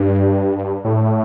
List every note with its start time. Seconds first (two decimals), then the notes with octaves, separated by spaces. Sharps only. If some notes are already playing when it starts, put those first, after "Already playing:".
Already playing: G2
0.85 A2